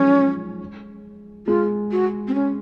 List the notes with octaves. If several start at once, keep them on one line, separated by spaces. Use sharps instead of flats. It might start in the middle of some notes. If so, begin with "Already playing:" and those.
Already playing: D#3 F3 F#3 G#3 C#4
G#3 F4
F#4
C4
C#4